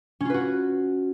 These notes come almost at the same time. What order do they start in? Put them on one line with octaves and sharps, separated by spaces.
C#4 F4 B4 F#4